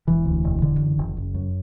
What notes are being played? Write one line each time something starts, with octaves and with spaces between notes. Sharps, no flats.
E1 E3
D2
E1
D3
F#1
F#1
F#1
F#2